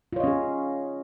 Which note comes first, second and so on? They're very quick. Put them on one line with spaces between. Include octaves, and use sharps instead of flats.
F4 C#5 D#5 C#4 G#4